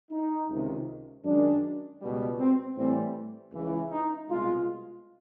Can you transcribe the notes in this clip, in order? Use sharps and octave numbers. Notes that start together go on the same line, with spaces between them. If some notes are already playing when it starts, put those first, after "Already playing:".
D#4
C#2 C3 D#3
F#2 D#3 G#3 D4
C#2 B2 G3
C4
A2 E3 G3 C4
C#2 C#3 E3
D#4
C2 B2 G#3 F4